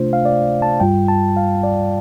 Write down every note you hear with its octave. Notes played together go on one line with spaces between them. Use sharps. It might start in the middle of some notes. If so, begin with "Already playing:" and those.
Already playing: C3 A3 D4 F4 C5
F5
D5
A5
G2 G3 F4 G5
A5
F5
D5